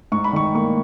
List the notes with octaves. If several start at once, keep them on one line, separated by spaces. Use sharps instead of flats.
G#2 C#6
B5
D#3 C#6
A#3 C#6